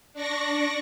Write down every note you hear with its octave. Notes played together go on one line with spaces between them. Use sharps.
D4 D5 C#6 A#6